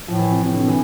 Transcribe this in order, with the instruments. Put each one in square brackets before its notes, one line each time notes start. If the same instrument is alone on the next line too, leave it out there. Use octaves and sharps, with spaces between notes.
[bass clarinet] A2 [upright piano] F3
[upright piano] E3
C3
[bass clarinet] A2 [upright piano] C3
[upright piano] D3
C3
E3